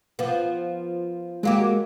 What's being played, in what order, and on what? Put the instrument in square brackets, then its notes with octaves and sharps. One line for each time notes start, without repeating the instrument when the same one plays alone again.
[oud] F3 B3
[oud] F#3 A#3 G4 [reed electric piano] G#3